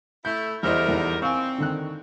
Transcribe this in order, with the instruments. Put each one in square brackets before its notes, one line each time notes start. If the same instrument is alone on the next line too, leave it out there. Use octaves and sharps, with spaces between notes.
[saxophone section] A3 E4 [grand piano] G6
[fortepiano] E2 [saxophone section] D3 G3 A#4 [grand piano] E4 C5 D#5
[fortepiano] E2 D#4
[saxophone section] C4 [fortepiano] F5 G#5 [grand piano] C#6
[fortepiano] D3 D#3 F#6